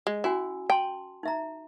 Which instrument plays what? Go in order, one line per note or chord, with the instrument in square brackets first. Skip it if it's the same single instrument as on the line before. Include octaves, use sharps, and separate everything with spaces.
[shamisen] G#3
[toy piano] C#4 F#4 G#5 [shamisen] E4
[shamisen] G5 [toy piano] A5 C6
[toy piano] D#4 E5 A#5